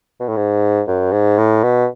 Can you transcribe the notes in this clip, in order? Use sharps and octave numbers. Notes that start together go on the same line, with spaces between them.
B2
A2
G#2
F#2
G#2
A2
B2